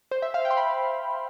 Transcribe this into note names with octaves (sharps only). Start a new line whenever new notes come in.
C5
E5
F5
G5
C6
B5